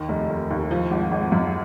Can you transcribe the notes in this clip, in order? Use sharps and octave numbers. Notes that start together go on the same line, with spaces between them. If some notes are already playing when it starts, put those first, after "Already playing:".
Already playing: D#2 D#3
F1
F1
D#2
F3
G#1
G#1
F#2